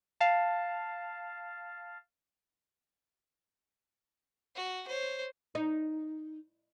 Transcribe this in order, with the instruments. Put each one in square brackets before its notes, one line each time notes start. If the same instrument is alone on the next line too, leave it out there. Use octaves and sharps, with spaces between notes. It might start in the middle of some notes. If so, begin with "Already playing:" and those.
[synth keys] F5 A5
[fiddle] F#4
C5 C#5
[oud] D#4